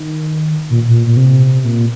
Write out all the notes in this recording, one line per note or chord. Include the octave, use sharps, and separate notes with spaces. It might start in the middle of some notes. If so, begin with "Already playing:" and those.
Already playing: D#3
A#2
A#2
A#2
C3
A#2